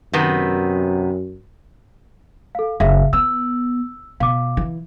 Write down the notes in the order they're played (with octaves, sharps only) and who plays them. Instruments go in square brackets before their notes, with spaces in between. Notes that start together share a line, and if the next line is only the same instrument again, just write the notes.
[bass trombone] F#2 [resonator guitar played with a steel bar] C3 D#3 B3
[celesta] A4 F5
[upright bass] F#1 [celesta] G#4 E5 F5
[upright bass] B3 [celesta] E6
[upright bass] B2 [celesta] F5 D6
[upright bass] E3